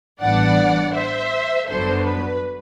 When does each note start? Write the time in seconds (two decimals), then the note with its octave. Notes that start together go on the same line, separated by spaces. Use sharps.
0.20 A1 G2 E3 B3 D4 D5 F#5
0.94 C5 E5
1.68 G1 F#2 F#3 B3 D4 A4 C5
2.05 B4